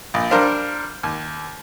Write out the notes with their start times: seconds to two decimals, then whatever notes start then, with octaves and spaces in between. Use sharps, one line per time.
0.14 A#1
0.31 G3 D4 A#4 C5 F5
1.03 D#2